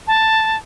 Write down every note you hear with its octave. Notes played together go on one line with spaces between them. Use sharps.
A5